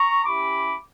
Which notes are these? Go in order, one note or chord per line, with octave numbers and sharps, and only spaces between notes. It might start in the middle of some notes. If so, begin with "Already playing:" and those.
Already playing: A#5 C#6
C#4 E4 G4 B5 D6